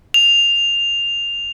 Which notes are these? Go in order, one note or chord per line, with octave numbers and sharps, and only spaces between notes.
F7